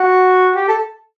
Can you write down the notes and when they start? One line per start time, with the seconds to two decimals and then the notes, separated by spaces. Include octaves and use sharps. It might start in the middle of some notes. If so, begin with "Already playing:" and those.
Already playing: F#4
0.55 G4
0.68 A4